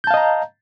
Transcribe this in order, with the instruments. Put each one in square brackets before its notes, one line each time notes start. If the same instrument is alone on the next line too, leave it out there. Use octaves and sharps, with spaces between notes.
[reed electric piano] G6
A5
F5
D#5
A#5